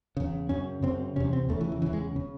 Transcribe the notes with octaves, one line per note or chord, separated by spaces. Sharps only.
E2 C#3
F#2 C#3 C#4
F#2 C#3 C4
E2 C3 C#4
C4
E2 C#3 A3
E3
E3
E2 C#3 E3
G#3
C#3